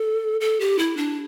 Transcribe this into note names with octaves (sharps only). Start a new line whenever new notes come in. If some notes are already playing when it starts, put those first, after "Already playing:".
Already playing: A4
A4
G4
E4
D4